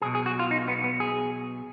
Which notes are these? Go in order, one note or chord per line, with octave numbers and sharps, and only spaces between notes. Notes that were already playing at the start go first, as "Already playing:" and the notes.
B1 B2 G#4
G#4
F#4
F4
D#4
B3
B3
G#4